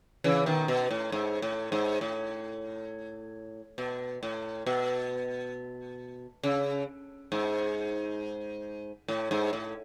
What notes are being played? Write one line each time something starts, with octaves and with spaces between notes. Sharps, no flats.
C#3 E3
B2 D#3
B2
A2
G#2
A2
G#2
A2
B2
A2
B2
C#3
G#2
A2
G#2
A2